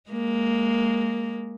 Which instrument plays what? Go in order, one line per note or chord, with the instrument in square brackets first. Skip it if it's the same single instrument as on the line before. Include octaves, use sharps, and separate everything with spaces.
[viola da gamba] G#3 A#3